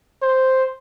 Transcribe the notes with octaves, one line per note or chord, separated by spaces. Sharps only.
C5